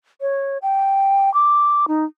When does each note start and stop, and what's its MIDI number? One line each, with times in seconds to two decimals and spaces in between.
0.21 0.58 73
0.62 1.32 79
1.34 1.86 86
1.88 2.05 63